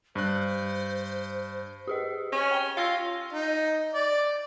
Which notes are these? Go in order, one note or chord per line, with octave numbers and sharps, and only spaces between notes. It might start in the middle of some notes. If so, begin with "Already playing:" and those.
G2 C5 F#6
G4 G#4 D#5
C#4
G5 G7
F4 F5 E6 A#6
D#4
D5